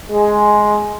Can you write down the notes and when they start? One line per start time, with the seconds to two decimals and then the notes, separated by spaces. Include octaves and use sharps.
0.10 G#3